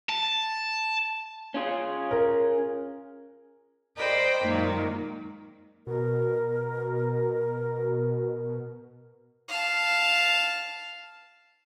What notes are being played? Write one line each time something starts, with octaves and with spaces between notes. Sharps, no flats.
A5
C#4 F4 G#4
A#4
A#4 C5 D5 D#5 G5 B5
F#2 A#2 D#3 G#3
B2 A#4
F5 A5